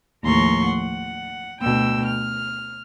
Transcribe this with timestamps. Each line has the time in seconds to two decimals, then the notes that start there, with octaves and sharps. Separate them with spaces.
0.24 D#2 A2 F3 A#5 C6 C#6
0.65 F#5
1.62 D2 B2 G5 E6
2.05 F6